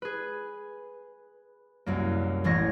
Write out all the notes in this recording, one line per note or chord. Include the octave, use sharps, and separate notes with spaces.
G#4 B4
C2 F#2 A#3
E1 A1 C#4 C#5 A#6